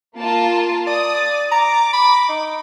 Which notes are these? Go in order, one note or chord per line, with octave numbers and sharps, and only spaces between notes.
A#3 F4 A5
D5 D#6
A#5 D6
B5
D#4